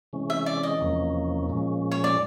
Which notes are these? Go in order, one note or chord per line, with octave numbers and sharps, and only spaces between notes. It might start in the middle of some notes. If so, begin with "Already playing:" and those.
C3 E3 G#3 C#4
E5
D5
D#5
E2 C3 F3 A#3 C#4
A#2 F3 G#3 C#4
C#5
D5